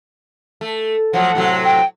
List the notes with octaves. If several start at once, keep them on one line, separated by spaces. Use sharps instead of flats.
A3
F3 F#3 A3 F#5
A2 C3 F#3
G5